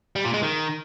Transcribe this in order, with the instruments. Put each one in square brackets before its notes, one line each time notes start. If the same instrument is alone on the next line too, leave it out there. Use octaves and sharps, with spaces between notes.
[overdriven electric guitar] G3
A#2
G#3
D#3